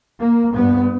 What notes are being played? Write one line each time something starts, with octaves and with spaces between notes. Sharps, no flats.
A#3
G2 B3